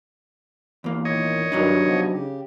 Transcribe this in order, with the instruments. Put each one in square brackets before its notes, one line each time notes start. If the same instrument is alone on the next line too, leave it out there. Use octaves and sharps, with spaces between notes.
[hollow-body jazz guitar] E2 A#3
[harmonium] A#2 D#3 [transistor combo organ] C#5 D#5
[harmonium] G2 D#3 [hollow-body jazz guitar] F#3 D4 D#4
[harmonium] C3 F3 B3
C#3 G4